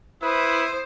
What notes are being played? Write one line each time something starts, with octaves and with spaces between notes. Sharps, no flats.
E4 B4 C5 D#6